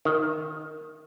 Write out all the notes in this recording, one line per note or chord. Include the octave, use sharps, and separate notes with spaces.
D#3